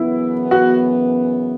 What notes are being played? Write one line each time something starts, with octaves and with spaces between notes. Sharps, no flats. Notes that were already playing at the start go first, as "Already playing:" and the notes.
Already playing: F#2 C#3 E3 B3 E4
F#4